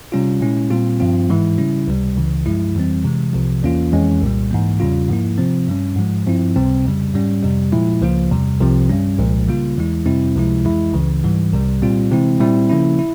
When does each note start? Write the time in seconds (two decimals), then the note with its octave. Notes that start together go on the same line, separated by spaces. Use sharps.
0.12 C3 G3 C#4 F4
0.41 A#2 G#3 C#4 E4
0.70 A#2 G3 C4 F4
1.00 G2 F3 C4 F4
1.29 G#2 E3 G#3 E4
1.58 C#3 G3 C#4 E4
1.87 C#2 C3 G3
2.16 C#2 C#3 E3
2.46 G2 F3 G#3 E4
2.75 F2 E3 G3 C4
3.05 C3 E3 G#3
3.33 C2 C3 F3
3.63 E2 E3 A#3 C#4 F4
3.92 F2 E3 G#3 C#4
4.22 C2 A#2 G3
4.51 G#2 E3 A#3
4.80 E2 C#3 G3 C#4 F4
5.09 G#2 F3 A#3 E4
5.38 C3 F3 C4
5.68 G2 G3 C#4
5.97 G#2 F3 G#3
6.26 G2 F3 C4 E4
6.56 C#2 C3 G3 C4
6.85 F2 C#3 G3
7.13 G#2 G3 C#4
7.43 F2 C3 G3
7.73 A#2 F3 G#3 E4
8.02 C#2 C#3 F3 A#3 F4
8.31 E2 C3 G3
8.60 C2 C3 F3 C4
8.90 G2 G3 C#4
9.19 C2 A#2 F3 G#3
9.48 C#3 G3 A#3 F4
9.77 E2 E3 G#3 E4
10.06 F2 C3 G3 C4 E4
10.35 C#2 C3 F3 G#3 E4
10.65 F2 E3 G#3 E4
10.94 C#2 C#3 E3
11.24 G#2 E3 G3
11.52 C2 C3 G3
11.82 A#2 G3 C4 F4
12.11 C3 E3 G#3 C4 E4
12.40 A#2 G3 C4 E4
12.69 C#3 F3 A#3 C#4 E4
12.99 E4